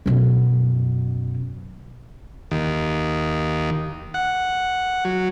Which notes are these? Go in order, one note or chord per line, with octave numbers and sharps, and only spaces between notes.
F#2 B2
D#2
F#5
F#3